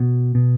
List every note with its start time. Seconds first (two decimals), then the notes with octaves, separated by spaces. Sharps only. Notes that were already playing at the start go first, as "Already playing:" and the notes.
Already playing: B2
0.35 B2